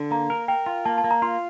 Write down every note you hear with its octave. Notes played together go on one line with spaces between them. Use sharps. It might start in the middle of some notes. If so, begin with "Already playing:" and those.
Already playing: D3
A#3 A#5
A#4
A#4 G5
F4
A#3 A5
A5
A#3
A#5
F4 C6